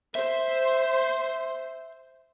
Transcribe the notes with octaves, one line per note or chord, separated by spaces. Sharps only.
C5 E5